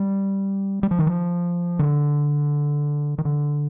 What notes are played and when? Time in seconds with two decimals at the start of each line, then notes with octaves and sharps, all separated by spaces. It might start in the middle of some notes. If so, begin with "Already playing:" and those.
Already playing: G3
0.83 G3
0.91 F3
0.99 D#3
1.06 F3
1.79 D3
3.18 D#3
3.25 D3